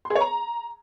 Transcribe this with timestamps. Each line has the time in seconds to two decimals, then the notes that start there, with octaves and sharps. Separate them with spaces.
0.05 C6
0.10 G#4
0.15 C#5
0.21 A#5